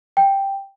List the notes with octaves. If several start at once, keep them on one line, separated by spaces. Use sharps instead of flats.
G5